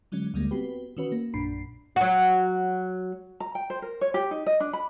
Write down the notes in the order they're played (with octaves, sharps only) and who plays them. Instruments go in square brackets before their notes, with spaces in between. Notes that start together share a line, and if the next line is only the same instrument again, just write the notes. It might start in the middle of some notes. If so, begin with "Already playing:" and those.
[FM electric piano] D3 F#3 G#3 C#4
D2 D3 G3 G#3 A#3
B3 C4 F#4 G4 B4
D#3 E3 C#4 F#4 B4
A#3
A#1 F#2 A#2 D4 B5 C7
[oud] F#3 F#4
[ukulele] A#5
G5
C5
A#4
C#5
G4
D#4
D#5
D4
B5